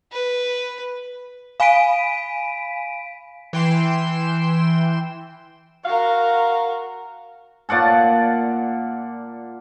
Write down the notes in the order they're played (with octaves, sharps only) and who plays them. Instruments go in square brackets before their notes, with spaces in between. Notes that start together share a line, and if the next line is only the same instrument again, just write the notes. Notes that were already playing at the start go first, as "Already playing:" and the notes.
[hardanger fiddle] B4
[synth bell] F5 G#5 B5 B6 D7 D#7
[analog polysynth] E3 G5 C6 E7
[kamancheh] F#4 A#4 [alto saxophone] F5
[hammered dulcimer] A#2 D5 F#5 A5